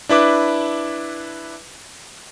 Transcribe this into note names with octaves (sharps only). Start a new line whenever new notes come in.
D4 E4 B4 D6